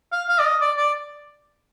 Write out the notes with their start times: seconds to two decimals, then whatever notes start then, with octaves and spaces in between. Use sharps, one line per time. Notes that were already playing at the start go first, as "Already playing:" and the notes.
0.12 F5
0.28 F5
0.39 D5
0.45 D#5
0.61 D5
0.77 D5